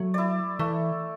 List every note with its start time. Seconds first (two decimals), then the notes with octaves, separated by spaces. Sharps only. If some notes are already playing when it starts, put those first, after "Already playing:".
Already playing: F#3 A3
0.14 E4 D5
0.59 E3 A3